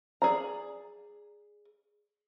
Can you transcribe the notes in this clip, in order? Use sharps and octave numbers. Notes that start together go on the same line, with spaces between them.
G#4 D5 A#5